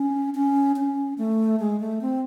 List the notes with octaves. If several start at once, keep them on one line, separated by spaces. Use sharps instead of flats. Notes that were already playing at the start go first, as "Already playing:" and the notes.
Already playing: C#4
C#4
C#4
A3
G#3
A3
C4